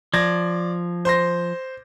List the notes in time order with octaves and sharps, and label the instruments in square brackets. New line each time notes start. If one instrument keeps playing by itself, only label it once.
[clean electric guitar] F3 [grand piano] D5 G#6 A#6
[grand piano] C5 C6 A#6